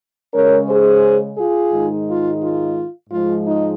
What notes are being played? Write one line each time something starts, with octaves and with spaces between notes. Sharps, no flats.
C#3 G#3 C#4 A#4 C#5
G#4 C5
F4 G#4
G#2 D#3 G#3 D#4
F4
F4
G#2 F3 G#3 F4
D#4